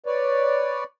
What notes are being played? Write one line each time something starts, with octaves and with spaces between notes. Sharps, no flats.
B4 C#5 D5